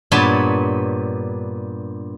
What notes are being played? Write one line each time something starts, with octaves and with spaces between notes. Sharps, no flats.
G2 A#2 B3 C#5 A5